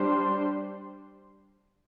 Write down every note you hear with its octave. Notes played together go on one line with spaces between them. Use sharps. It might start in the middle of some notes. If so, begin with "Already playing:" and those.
Already playing: G3 D4 G4 C5